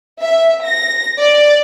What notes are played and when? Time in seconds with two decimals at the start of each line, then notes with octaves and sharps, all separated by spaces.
0.20 E5
0.64 A#6
1.18 D5